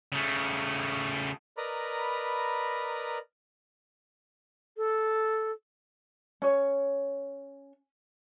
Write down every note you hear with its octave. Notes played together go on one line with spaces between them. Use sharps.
C#3 A3
A#4 B4 D5 D#5 A#5 B5
A4
C#4 C#5